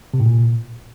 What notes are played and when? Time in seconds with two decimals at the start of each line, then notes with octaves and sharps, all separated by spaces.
0.14 C3
0.20 A2
0.26 A#2